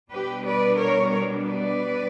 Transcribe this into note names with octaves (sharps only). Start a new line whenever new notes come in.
B2 G3 B3 D4 G4 B4
B4 D5
A#4 C#5
B4 D5